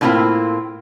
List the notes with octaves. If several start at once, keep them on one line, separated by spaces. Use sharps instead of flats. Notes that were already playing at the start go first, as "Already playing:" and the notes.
A2 D3 A#3 C4 E4 F4